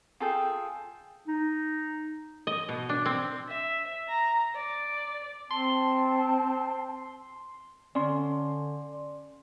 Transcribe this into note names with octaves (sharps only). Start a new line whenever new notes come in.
F4 G#4 A4 G5
D#4
D#5
B2
D4
C4
E5
A#5
D5
C4 A5 C6
D3 C#4 D5 C6